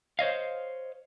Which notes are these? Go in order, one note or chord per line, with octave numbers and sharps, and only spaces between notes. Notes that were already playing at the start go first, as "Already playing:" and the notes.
C5 C#5 D#5 F5